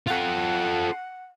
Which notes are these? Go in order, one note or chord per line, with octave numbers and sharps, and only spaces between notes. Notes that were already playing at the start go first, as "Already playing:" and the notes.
F4 A4 F#5